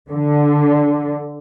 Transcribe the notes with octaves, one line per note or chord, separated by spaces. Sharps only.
D3